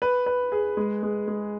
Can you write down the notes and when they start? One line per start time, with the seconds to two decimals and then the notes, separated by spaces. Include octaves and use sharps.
0.02 B4
0.26 B4
0.52 G#4
0.77 G#3
1.03 G#3
1.28 G#3